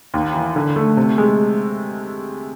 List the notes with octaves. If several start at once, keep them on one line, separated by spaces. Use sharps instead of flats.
D#2
E3
D3
A3
C3
G#3